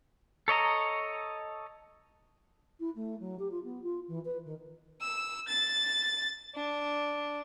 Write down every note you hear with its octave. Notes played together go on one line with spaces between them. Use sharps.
A4 C#5 D#5 A#5
E4
A3
F#3
G4
F4
B3
F4
E3
B4
D#3
E6
A6
D4